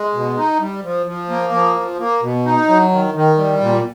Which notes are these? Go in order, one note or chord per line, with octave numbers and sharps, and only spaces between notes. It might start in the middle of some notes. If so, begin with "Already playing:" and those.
Already playing: G#3
B2
D#4
G3
F3
F3
A#3
F3
F3
A#3
B2
D#4
F#3
D#3
D#3
G3
A#2